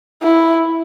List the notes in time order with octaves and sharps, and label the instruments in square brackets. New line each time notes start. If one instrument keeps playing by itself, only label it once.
[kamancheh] E4